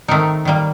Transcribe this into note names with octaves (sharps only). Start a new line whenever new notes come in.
D#3 A3 C4 D#4 A#4
D#3 G3 A#3